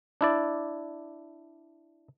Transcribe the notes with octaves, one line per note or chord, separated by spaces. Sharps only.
D4 E4 D5